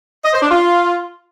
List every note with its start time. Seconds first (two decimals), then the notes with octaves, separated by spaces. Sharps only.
0.25 D#5
0.34 C5
0.42 D4
0.51 F4